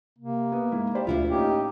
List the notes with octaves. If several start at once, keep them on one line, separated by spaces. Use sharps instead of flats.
C3 A#3
B3
G#2 G#3 E4
G4 C5 D5 B5
E1 D2 D4 E4 F4
A2 A#3 C#4 D#4 G4